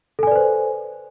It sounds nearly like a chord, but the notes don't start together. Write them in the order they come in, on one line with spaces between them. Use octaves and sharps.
A4 G#5 D5 B4 C5